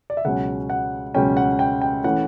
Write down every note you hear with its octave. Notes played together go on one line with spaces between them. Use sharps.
D5
E5
C#2 B2 F#3 C#4 F#5
F#5
C#2 B2 F#3 C#4 G5
F#5
G5
G5
E3 A3 C#4 F#5